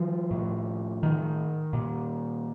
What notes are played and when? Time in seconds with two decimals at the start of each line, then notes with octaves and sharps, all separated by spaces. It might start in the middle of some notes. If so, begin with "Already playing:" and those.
Already playing: D#3 F3
0.31 A2
1.03 D#3
1.73 A#2